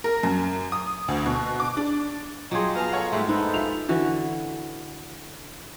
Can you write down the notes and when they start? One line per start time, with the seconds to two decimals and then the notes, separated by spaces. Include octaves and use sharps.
0.04 A#4
0.23 F#2
0.72 D#6
1.08 D2
1.26 B2
1.60 D6
1.77 D4
2.51 F#3 F4 G4 G#4 D#5 C6
2.75 B3 G#4 D#5 F5 A5 A#5 F6
2.92 A4 C#5 F#5
3.12 G#2 G#3 A3 G#4 E5 G5
3.29 B3 D#4 A4 C5
3.54 F4 G4 E5 F7
3.89 D3 E3 F#4